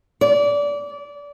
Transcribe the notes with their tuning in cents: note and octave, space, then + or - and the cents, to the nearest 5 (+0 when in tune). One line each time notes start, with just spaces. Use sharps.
D5 -25